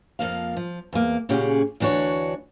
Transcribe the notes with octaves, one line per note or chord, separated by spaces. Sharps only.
F2 F3 A#3 F5
F3
E2 A#3
A#2 C#3 C#4 G4 G#4 F#5
D2 E3 D4 F#4 C#5